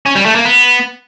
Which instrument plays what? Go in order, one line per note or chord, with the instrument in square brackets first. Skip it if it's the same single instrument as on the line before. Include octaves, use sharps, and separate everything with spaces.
[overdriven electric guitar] C#4
G3
A3
A#3
B3